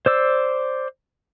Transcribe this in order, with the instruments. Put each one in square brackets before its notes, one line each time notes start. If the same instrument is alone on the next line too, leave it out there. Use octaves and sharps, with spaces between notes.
[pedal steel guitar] C5 D5 E6